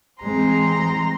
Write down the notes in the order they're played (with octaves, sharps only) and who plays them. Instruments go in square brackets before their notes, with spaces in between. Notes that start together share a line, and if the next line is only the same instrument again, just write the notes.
[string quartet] E3 A#5 C6 [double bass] G#3 C4